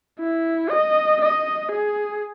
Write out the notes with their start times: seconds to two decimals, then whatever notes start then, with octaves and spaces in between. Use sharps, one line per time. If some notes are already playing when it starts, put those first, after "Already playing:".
0.20 E4
0.71 D#5
1.21 D#5
1.71 G#4